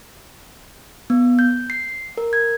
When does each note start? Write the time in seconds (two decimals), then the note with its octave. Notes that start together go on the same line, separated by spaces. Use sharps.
1.10 B3
1.39 G6
1.70 C7
2.18 A#4
2.33 G#6